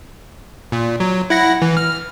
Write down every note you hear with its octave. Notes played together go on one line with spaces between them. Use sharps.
A#2
F#3
E4 F#5 A#6
E3
F6